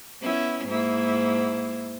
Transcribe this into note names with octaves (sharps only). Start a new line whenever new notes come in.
B3 C#4 E4
G#2 A#3 E4